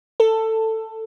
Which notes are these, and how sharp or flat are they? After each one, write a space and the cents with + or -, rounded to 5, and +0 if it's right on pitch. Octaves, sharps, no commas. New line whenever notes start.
A4 +15